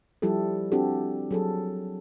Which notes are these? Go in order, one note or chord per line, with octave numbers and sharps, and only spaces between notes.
F3 G3 E4 G4 A4
C4 D4 E4 F#4 G4 A4
F#3 G#4 A4